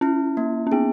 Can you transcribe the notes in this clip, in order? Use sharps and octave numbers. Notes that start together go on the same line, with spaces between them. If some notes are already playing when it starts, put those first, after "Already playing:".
C#4 E4
A#3
C#4
B3 G#4